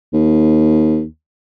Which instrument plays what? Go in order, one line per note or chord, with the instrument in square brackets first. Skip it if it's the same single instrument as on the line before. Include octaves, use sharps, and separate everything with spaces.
[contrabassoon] D#2